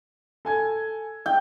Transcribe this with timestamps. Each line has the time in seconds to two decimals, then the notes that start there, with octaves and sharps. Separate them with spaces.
0.45 A4 G#5 G#6
1.26 G5